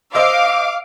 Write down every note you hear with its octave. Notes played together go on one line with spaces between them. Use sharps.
C5 D#5 F5 D6 E6